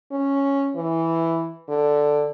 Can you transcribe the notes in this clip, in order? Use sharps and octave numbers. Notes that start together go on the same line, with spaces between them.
C#4
E3
D3